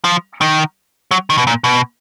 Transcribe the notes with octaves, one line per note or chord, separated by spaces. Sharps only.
F3
D#3
F#3
D#3
B2
A#2
B2